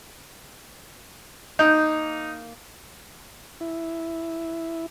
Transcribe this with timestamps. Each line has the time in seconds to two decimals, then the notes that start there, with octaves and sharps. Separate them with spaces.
1.59 A#3 D#4 G6
3.61 E4